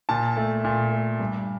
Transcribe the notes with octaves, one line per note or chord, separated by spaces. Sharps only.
A#2 A5
A3
A#2
A3
G2